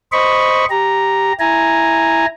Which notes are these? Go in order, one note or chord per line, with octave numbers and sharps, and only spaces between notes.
C5 D#5 B5 C#6
G4 A#5
E4 G#5 A#5